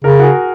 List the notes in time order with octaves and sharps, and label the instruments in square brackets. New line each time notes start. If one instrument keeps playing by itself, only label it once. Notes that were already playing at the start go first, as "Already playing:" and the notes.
[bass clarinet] C#3 [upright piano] A#4
[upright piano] F#4
G#4